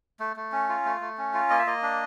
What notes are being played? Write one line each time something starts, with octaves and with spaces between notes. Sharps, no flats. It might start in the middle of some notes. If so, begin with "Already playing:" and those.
A3
A3
C#4
F4
A3
A3
C#4
F4
A#3 D#5
E5
A#3 D#5
D4